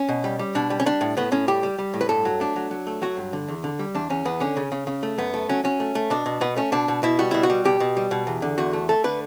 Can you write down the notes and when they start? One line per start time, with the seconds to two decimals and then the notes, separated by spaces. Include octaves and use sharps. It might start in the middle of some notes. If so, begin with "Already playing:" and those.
Already playing: C#4
0.09 B2
0.24 G3
0.39 G3
0.55 B2 D4
0.70 G3
0.80 C#4
0.86 G3 D4
1.01 A2
1.17 A2 B3
1.32 A2 C#4
1.48 G3 G4
1.63 G3
1.78 G3
1.94 A2
2.01 B4
2.09 G2 A4
2.25 F#3
2.40 A3 D4
2.56 F#3
2.71 F#3
2.87 A3
3.02 F#3 F#4
3.17 G2
3.33 D3
3.48 E2
3.64 D3
3.79 G3
3.95 E2 D4
4.10 E2 C#4
4.25 E2 B3
4.40 D3 C#4
4.57 C#3
4.72 C#3
4.87 C#3
5.03 A3
5.18 F#2 B3
5.34 A3
5.49 F#3 C#4
5.64 F#3 C#4
5.80 A3
5.95 A3
6.10 B2 D4
6.26 B2
6.41 B2 B3
6.57 A3 C#4
6.72 B2 D4
6.88 B2
7.03 B2 E4
7.19 G3 F#4
7.31 B2 E4
7.43 F#4
7.50 G3
7.65 B2 G4
7.80 B2
7.97 G3
8.11 B2
8.27 E2
8.42 D3
8.58 E2 F#4
8.73 A3
8.89 A3 A4
9.04 D3 B4